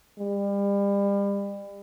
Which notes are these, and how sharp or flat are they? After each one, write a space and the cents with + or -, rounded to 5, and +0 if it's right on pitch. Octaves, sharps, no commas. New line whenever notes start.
G3 +35